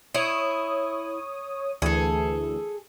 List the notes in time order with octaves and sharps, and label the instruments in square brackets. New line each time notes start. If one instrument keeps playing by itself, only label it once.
[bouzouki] E4 [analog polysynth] C#5 D#6
[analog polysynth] D2 E3 [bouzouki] G#4 A4